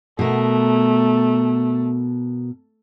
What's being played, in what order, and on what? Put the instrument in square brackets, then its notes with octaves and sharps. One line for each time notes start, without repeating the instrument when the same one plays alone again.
[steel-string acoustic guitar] B2 A#4 [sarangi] A3